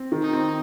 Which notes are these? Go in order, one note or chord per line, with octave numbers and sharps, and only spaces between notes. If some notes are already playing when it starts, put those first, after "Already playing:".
Already playing: C4
D#3
D#4
C4